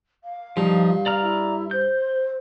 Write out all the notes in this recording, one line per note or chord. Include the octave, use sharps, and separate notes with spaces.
F5
G2 F3 D#4
D5 A#5 F6
E4
C5 G6